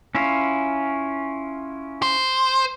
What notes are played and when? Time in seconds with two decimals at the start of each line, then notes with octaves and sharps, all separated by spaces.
0.15 C#4 E4 F4
2.02 C5